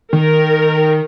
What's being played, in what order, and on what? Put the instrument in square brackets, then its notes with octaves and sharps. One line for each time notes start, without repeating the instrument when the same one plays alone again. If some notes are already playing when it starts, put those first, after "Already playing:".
[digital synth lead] D#3 [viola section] A#4